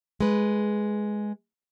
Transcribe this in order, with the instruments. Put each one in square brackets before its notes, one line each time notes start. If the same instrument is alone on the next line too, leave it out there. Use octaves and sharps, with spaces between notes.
[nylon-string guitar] G#3 B4